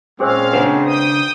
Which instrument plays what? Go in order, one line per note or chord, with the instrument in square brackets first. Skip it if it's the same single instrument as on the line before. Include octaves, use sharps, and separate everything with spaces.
[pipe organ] A#2 F5 [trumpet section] G#3 C4 C#4 [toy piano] G#4 C5 E6
[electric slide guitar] C#3 D4 C5 [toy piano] B4 F#5
[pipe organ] G5 D#6